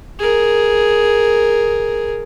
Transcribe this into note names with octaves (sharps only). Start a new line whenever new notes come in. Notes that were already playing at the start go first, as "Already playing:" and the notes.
G#4 A#4